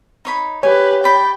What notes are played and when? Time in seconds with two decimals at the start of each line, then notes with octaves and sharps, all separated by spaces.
0.25 D#4 C#5 B5
0.63 G4 B4 C#5 G#5
1.04 D5 G5 B5